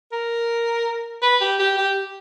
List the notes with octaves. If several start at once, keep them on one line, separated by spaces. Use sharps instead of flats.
A#4
B4
G4
G4
G4